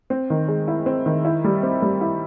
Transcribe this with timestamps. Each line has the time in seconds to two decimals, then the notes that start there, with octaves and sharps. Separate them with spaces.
0.10 C4
0.30 D#3
0.48 G#3
0.68 E4
0.86 C4
1.06 D#3
1.25 E4
1.44 G3
1.63 C4
1.82 G3
2.01 E4